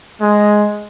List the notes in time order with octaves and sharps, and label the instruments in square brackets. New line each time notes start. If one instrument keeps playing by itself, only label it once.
[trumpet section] G#3